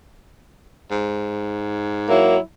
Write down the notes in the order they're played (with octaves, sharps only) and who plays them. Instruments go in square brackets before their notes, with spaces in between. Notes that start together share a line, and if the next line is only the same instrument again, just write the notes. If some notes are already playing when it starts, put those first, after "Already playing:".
[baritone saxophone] G#2
[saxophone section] F#3 A#3 E4